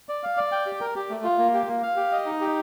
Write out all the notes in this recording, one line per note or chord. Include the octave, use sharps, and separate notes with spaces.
D5
F5
D5
G5
G4
A#4
G4
A3
F4
A#3
G4
A#3
F5
G4
D#5
D#4
G4